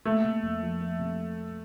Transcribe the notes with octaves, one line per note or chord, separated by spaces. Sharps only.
A3 A#3
C3
F2
F3
A#3
C3